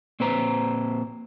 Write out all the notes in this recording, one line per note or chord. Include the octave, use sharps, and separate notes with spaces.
A#2 C4 B4 C5 A#5